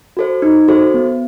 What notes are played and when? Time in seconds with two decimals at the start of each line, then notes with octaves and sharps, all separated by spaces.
0.17 F#4 A4 C5
0.42 D#4
0.68 F#4 A4 C5
0.94 B3